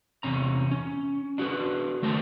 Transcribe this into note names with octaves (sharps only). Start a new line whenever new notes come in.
E2 C3 C#4 A#5
C#4
D4 F#4 G#4 B4
D#3 A3 A#4 C5 G#5 A5